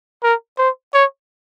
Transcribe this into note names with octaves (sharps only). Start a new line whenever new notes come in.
A#4
C5
C#5